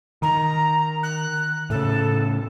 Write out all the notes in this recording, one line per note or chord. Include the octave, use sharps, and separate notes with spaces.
D#3 A#5
F#6
A2 C#3 A4